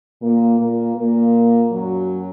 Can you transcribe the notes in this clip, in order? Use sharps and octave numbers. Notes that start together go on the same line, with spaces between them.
A#2 A#3
A#2 A#3
A#2 A#3
F#2 F#3